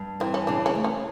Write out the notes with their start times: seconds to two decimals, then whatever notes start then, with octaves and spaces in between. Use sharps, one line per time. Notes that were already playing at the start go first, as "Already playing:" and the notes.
Already playing: G2
0.20 E3 C4
0.34 C#4
0.47 C#3 D4
0.66 C#4
0.75 A3
0.84 C#4